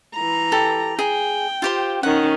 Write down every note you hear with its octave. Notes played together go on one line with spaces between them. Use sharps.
E3 A#5
G4 A4
G#4 G5
F4 G4 C5
D#3 C#4 F#5